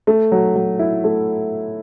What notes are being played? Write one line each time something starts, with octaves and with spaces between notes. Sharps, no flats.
A3
F#3
F#3
E4
A3